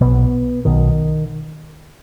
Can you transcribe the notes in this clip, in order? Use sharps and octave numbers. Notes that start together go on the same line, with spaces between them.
B1 B2 B3
B1 B2 D#3